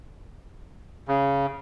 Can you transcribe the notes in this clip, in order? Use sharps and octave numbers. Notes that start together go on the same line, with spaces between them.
C#3